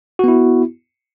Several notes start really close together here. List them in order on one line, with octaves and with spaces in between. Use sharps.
F#4 B3 E4